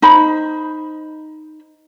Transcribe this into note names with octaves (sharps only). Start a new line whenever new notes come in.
D#4 C5 B5